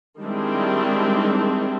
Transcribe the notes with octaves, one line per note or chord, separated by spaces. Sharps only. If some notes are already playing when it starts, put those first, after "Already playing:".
D#3 G3 G#3 C4 D4 E4